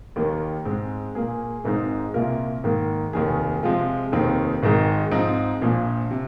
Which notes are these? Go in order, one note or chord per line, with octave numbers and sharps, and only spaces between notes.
D#2 D#3 A#3
G#2 G#3 C4
A#2 A#3 G#4
G#1 G#2 G#3 C4 D#4
C2 A#2 A#3 F4 A#4
G#2 D#3 A#3
F1 D#2 D#3 A#3 G#4
C3 F3 G#3 F4
F1 D#2 D#3 C4 D#4
G#1 G#2 D#3 G#3
G#2 F3 C4 D#4
A#1 A#2 F3
C3